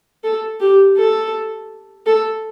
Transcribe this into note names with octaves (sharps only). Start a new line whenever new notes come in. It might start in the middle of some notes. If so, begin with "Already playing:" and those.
A4
G4
A4
A4